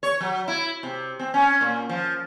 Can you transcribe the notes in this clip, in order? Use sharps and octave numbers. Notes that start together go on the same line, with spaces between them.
C#5
F#3
E4
C3
C4
C#4
A#2
F3